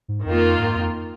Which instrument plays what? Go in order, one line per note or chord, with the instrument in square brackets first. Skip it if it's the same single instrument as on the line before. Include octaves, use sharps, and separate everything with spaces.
[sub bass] G#2
[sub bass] F2 [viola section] D#3 A#3 F4
[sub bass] G#2
F2